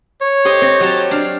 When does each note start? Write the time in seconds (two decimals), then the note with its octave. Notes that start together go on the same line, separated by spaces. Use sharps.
0.21 C#5
0.45 G4 C5 D#5
0.62 C4
0.80 F#3 G4 A5
1.11 D4 F5